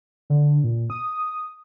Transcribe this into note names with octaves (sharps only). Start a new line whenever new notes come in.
D3
A#2
D#6